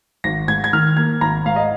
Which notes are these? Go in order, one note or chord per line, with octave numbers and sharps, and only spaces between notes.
G#1 A#6
G#2 G#6
G#6
D#3 F6
A#3 G#6
G#1 A#5
G#2 F5
D#5